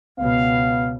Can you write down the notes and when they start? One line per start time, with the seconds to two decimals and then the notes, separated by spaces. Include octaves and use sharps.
0.19 C#2 B2 B3 F5